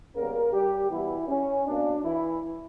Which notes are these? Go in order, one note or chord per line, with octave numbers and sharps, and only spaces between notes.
C#3 G3 A#3 B3 A#4
G3 G4
B2 E3 G3 B3 E4
C#4
B2 A#3 D4
E3 E4